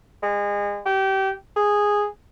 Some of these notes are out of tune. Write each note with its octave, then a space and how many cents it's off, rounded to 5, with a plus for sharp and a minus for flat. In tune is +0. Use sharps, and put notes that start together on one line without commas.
G#3 -30
G4 -25
G#4 -5